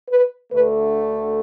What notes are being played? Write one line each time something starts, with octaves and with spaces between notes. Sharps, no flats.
B4
D2 D3 A3 B4